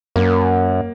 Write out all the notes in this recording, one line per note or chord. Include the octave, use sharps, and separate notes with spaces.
F#2 A#3